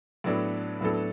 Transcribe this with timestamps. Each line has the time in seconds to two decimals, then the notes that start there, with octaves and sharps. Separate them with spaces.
0.24 A2 F#3 B3 D4 A4
0.81 A2 F#3 B3 D4 A4